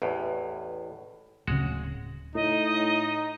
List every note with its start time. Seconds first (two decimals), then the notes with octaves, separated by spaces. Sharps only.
0.02 A1 E2 A2
1.47 D1 C#3 G#3 F#4
2.35 A2 D#4 D#5